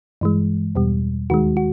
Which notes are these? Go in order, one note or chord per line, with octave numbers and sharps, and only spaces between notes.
G2 E3 G#3
E2 B2 G3
D#2 D#3 G#3 F#4
F#4